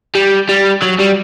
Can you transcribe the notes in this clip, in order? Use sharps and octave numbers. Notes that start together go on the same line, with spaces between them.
G3
G3
F#3
G3